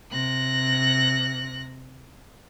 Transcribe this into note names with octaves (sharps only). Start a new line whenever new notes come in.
C3 F#6 A#6